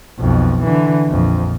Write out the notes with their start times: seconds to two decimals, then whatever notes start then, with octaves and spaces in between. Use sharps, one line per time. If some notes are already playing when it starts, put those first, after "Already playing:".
0.20 B1 F2
0.63 D3 E3
1.08 A#1 F2